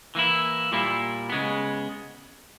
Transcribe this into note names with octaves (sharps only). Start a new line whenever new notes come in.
E3 A#3 E4
A#2 G3 A#3 E4
C#3 G#3 B3